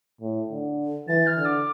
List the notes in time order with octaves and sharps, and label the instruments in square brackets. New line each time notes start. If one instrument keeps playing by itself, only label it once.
[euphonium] A2
D3
[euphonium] E3 [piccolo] A6
[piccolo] F6
[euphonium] D3
[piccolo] D6